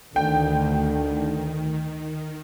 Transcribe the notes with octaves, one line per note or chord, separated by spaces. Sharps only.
D2 D3 D#3 G5